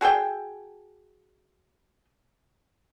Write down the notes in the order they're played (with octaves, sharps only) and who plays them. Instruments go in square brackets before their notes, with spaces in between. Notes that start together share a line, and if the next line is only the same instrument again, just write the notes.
[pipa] F#4 G#4 A4 G5